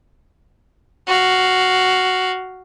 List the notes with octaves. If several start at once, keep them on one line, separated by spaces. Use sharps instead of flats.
F#4 F5